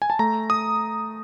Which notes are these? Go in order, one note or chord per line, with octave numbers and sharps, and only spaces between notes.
G#5
A5
A3 A#5
D#6